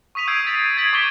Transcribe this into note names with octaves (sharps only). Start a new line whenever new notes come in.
C#6 D#6 B6 D#7 F7
D#6 E6 G6 G#6 C7 D7
A6 B6 F7
G#6 A6 B6 D7 F#7
C#6 D6 G#6 B6 D7 G7